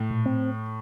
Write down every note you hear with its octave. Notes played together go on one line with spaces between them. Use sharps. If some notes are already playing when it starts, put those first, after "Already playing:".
Already playing: A2
A#2
C4